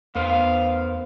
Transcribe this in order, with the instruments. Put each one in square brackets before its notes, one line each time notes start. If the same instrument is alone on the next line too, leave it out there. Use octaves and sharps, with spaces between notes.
[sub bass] E2 [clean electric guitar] B3 A#4 C5 [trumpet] F5